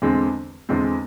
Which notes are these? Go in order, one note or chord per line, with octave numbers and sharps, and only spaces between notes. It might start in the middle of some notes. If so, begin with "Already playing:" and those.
E2 D3 G#3 C4
E2 D3 G#3 C4